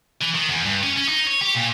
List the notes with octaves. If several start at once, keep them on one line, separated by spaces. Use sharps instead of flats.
E3
D#3
E2
G2
C#4
C#4
D#4
C#5
G4
A#2